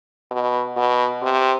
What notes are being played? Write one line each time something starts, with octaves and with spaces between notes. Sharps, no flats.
B2
B2
C3